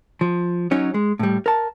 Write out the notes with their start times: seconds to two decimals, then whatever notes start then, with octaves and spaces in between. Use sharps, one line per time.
0.21 F3
0.71 F#3 C#4 D#4
0.94 G#3
1.19 A2 G3
1.46 A#4 A5